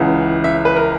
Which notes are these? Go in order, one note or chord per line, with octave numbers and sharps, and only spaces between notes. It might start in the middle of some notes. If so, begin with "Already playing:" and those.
Already playing: C#2 C#3 E3 F#5
E5
B4
A#4